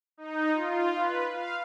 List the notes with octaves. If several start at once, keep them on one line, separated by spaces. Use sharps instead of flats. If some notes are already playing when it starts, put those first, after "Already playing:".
D#4
F4
B4
F5